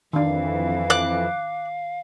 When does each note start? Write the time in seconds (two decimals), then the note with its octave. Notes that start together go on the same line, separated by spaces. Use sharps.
0.13 F2 D#3 E3 D4 F5
0.90 D6 F#6